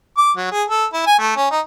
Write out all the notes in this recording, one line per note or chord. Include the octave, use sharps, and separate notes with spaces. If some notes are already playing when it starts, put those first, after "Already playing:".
D6
F#3
G#4
A4
E4
G#5
A3
C#4
D#4